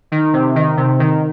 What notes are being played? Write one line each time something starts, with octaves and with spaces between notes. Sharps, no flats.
D#3
C3
D#3
C3
D#3